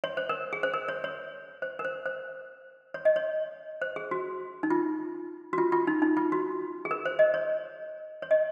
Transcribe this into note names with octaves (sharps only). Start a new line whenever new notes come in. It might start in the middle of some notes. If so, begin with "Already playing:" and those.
C#5
C5
A#4
G#4
C5
A#4
C#5
C#5
C5
A#4
C5
C5
C#5
D#5
C#5
C5
G#4
F#4
D#4
F4
F#4
F4
F4
D#4
D#4
F4
F#4
G#4
A#4
C5
D#5
C#5
C#5
D#5